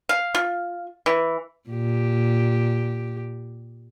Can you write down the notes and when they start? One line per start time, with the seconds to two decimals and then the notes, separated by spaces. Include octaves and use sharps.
0.09 F5
0.35 F4
1.06 E3
1.70 A#2 G4